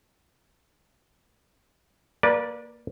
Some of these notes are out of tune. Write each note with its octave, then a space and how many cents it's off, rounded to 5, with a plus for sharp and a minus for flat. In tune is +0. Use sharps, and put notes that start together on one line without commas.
A#3 +0 B4 -30 D5 +0